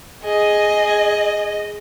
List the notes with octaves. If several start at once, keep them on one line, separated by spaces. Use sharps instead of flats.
G#4 D#5